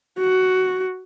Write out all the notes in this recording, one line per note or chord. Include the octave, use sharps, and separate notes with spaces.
F#4